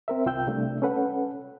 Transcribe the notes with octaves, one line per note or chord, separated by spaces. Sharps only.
C4 A#4 E5
C2 F4 G5 E6 G6
C3 G3 A3 D4
C#4 A4 B4 F#5